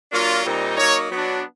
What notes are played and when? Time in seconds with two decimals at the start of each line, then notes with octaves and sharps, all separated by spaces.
0.10 F#3 A#3 D4 F4
0.44 A#2 G3 C4 D#4
0.76 F#3 A#3 D#4 C#5
1.10 F#3 B3 D4